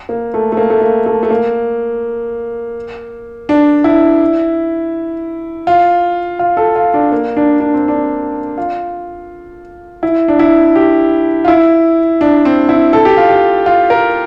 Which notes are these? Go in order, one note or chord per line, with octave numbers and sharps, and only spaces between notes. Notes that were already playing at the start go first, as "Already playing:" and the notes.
A#3
A3
A3
A#3
A3
A#3
A3
A3
A#3
D4
E4
F4
F4
A4
F4
D4
A#3
D4
D4
C4
D4
F4
E4
D4
E4
G4
F4
E4
D4
C4
E4
A4
G4
F4
G4
F4
A#4